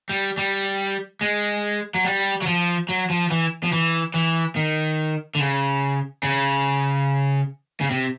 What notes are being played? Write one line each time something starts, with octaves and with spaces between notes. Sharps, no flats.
G3
G3
G#3
F#3
G3
F#3
F3
F#3
F3
E3
F3
E3
E3
D#3
D3
C#3
C#3
C#3
C3